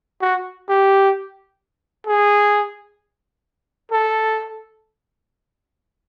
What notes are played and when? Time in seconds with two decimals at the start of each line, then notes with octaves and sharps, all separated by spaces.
0.21 F#4
0.69 G4
2.07 G#4
3.92 A4